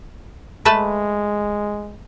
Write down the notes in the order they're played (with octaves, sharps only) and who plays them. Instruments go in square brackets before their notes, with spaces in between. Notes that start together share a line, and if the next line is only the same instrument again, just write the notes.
[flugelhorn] G#3 [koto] A3 B4 A5